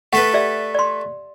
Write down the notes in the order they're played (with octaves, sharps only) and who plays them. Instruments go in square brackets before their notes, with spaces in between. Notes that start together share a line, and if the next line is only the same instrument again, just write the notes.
[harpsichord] A3 A4 B4 [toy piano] F#5
[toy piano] G4 D5 E5
D5 C6